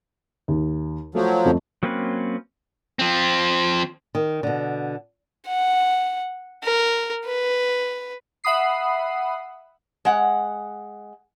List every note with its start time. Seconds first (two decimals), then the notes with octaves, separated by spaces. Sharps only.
0.48 D#2
1.15 F3 F#3 A3
1.45 F2 A3
1.83 F#3 A#3 C4 C#4 B4
2.99 F3 C4
4.15 D#3
4.43 B2 D3
5.47 F#5
6.63 A#4
7.26 B4
8.44 E5 F#5 B5 D#6 C7
10.05 G#3 F#5